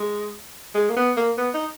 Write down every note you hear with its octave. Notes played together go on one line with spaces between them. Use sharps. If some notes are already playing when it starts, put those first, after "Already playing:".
Already playing: G#3
G#3
A#3
B3
A#3
B3
D#4